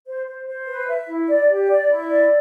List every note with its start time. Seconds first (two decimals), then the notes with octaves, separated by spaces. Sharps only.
0.06 C5
0.26 C5
0.47 C5
0.66 B4
0.87 E5
1.07 E4
1.27 D5
1.48 G4
1.68 D5
1.88 E4
2.08 D5